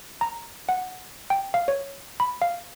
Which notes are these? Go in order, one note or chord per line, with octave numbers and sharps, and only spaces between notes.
A#5
F#5
G5
F5
C#5
B5
F5